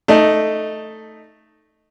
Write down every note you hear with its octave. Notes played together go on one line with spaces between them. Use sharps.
A3 D#4